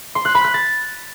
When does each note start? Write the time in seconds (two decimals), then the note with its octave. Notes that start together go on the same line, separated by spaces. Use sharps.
0.15 C6
0.25 F#6
0.35 B5
0.44 F#6
0.54 A6